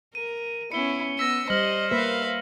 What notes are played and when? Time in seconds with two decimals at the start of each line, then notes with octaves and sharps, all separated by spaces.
0.15 A#4 D#7
0.72 B3 C#4 E4 C#7 G7
1.19 B3 E6 A#6 B6
1.50 G3 C5 D#5 F6 F#7
1.91 A#3 B4 E5 F5